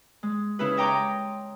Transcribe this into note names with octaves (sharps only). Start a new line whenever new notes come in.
G#3
C#3 C#4 E4 G#4 B4
C#5 D#5 G5 A#5 C6 D6